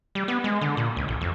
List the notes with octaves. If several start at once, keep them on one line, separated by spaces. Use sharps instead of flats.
G3
B3
G#3
D3
A#2
C#2
A1
F2